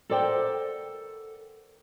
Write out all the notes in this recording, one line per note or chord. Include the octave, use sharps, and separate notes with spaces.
A4 A#4 C5 D5 F#5 G5